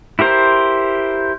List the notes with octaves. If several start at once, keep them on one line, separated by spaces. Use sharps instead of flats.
E4 G4 A#4 C5